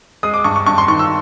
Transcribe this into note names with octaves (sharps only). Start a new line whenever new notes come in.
G#3 D#6
D6
G2 C#6
C#6
G2 C#6
C6
D#3 C#6
E6